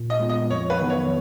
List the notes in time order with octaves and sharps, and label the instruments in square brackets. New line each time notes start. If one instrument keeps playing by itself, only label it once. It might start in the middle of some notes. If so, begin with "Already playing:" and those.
Already playing: [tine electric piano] A#2
[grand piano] D#5
[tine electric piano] G#3 B3 F4
[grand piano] D#5
[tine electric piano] F2 [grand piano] C#5
[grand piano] B4
[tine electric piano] D#3 F#3 B3
[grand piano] C#5